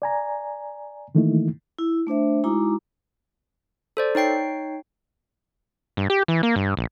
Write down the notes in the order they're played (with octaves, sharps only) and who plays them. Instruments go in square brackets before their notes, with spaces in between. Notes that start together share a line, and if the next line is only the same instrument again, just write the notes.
[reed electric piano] D5 G#5 A#5
D#3 E3 A3 A#3 D#4 E4
[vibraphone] E4
A3 D4 C5 E5
G#3 D#4 E4 F#4 A#5 D6
[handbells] A4 C5 D5
D#4 C#5 G5 C7
[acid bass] G2
G4
E3
A#3
G2
A#1